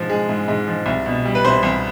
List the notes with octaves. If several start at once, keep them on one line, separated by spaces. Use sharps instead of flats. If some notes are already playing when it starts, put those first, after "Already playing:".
Already playing: G#2 F3
G#3
G#2
G#2
F3
C2
B2
G3
B4
C2 C5
C2